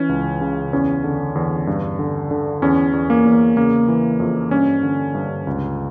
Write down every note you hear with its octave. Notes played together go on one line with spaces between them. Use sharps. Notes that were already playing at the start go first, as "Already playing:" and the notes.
Already playing: E3 C#4
C#2
C#3
E2 C#4
D3
E2
G2
D3
D3
E2 C#4
E2
A#3
E2
C#3 A#3
E3
F2
G2 C#4
D3
G2
C#2